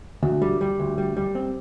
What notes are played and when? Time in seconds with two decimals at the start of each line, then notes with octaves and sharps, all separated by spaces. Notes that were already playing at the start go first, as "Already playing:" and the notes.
0.23 D2
0.42 G3
0.61 G3
0.80 D2
0.98 G3
1.17 G3
1.35 C4